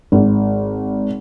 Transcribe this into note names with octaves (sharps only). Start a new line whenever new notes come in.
G#1